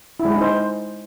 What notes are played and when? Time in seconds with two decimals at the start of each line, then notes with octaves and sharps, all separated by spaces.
0.20 E4
0.25 G#3
0.30 G#4
0.36 D#4
0.41 C5